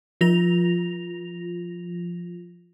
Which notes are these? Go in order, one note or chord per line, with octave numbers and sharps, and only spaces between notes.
F3 F4 A#6 F7